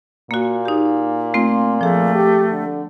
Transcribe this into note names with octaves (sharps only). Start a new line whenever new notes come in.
A#2 A#3 F#4
D#4 G4
A3 C4 F4 C6
F3 A3 G#4
G4
D3